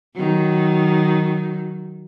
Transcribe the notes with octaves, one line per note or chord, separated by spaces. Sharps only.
D#3 F#3